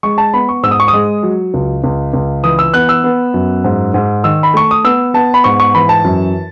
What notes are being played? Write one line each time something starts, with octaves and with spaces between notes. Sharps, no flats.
G#3 C#6
A5
B3 B5
C#6
G#2 E6
D#6
C#6
D#6
G#3
F#3
C#2
C#2
C#2
E3 D#6
E6
B3 F#6
E6
B3
F#2
G#2
G#2
D#3 E6
B5
A3 C#6
D#6
B3 E6
B3 A5
B5
G#2 C#6
C#6
E3 B5
A5
F#2